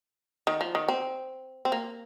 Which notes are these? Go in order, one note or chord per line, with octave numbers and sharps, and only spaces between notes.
D#3
F3
D#3
C4
C4
A#3